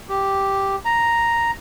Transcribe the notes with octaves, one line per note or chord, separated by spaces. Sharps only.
G4
A#5